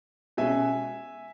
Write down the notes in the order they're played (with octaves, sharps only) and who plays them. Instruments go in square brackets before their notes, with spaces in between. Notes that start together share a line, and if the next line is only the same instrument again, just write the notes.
[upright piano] B2 G#3 C#4 [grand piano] E5 G#5